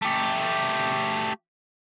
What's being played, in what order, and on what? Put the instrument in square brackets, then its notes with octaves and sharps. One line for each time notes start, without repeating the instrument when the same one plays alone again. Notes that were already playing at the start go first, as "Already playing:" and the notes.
[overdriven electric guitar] A3 G4